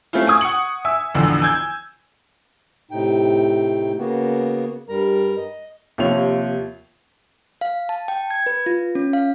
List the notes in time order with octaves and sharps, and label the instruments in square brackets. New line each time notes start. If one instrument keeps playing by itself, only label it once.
[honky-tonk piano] A3 C4 C#4 E4 F4
G#5 C#6 D#6 G#6
F#5 C#6 C#7 F#7
E5 G#5 E6
A1 E2 D3 F3
G#5 E6 G6 G#6
[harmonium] A2 C3 D#4 G5
C#3 A#3 B3 F#4
G2 G3 A#4 A#5
D#5
[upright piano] D#2 C3 F3 C#5 F7
[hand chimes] F5
A5
G5
G#6
B4
F4
C#4
F5